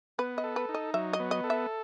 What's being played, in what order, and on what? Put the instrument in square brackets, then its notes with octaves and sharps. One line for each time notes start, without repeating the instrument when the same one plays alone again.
[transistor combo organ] B3 [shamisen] B4
[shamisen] D#5
[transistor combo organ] A4
[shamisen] B4
[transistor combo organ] D#4
[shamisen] D#5
[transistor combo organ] F#3 [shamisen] E5
[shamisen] D#5
[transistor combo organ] B3
[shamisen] D#5
[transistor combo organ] A4
[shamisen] E5